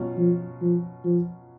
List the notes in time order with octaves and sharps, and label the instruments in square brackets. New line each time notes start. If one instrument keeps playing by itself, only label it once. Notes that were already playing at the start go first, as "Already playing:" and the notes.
Already playing: [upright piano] B2 F#3 C#4 F4
[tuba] F3
F3
F3